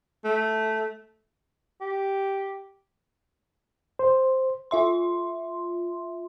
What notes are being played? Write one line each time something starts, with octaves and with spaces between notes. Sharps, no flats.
A3
G4
C5
F4 E5 C6